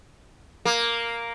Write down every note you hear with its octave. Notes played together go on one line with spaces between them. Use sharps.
A#3